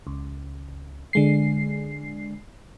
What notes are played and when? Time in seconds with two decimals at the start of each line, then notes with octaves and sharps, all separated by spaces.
0.07 C#2
1.13 D3 G#3 C7